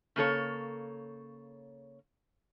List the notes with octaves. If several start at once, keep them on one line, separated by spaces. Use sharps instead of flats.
C#3 A#3 A4 C#5